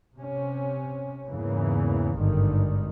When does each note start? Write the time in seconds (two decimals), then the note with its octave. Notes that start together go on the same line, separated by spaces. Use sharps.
0.17 C3 C#4
1.27 E2 G#2 C#3 E3 A#3
2.17 G#1 G2 D3 D#3